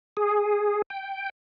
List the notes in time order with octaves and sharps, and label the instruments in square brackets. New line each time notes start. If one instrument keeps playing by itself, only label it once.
[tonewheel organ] G#4
G5